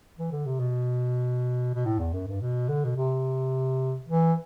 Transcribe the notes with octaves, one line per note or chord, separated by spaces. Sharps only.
E3
D3
C3
B2
B2
A2
E2
F#2
G2
B2
D3
B2
C3
E3